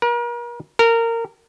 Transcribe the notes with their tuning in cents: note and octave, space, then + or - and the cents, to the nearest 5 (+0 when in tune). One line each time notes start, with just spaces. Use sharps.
A#4 +40
A#4 -20